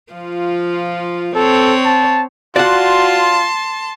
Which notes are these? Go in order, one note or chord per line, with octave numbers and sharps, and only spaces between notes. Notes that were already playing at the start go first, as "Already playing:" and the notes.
F3 F4
C4 A4 C#5
A5
F4 F#4 D5 F#5 A5 C6